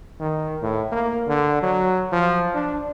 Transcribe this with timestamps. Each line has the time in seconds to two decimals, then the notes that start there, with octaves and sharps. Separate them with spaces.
0.20 D#3
0.62 A2
0.91 A#3
1.27 D3
1.63 F#3
2.12 F3
2.54 D4